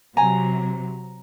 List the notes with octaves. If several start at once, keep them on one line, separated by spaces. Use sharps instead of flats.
C3 F#3 G#5 A#5